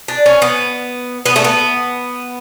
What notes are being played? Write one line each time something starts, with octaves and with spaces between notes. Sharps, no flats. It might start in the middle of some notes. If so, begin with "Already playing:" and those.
D4
C#4
B3
B3
A3
B3